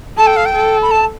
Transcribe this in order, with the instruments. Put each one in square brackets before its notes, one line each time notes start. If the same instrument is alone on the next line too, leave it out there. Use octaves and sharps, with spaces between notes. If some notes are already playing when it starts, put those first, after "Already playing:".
[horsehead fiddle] A4 [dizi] A5
[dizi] G5
F5
G5
[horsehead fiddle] A4
[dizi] B5
A5